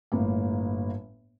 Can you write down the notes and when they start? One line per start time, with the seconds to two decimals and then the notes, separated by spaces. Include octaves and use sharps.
0.12 G1 A2 A#3